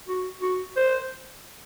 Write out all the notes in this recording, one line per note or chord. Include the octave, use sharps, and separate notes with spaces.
F#4
F#4
C5